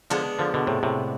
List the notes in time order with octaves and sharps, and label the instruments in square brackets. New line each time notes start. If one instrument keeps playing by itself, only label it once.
[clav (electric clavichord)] D3 F3 [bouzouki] G#3 B3 D4
[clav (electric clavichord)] D3 F3
B2 D3
A2 C3
A2 C3